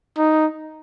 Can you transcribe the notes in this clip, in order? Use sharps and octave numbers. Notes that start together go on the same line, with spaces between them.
D#4